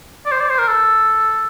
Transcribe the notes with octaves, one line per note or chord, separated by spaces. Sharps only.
D5
C5
D5
C5
A#4
A4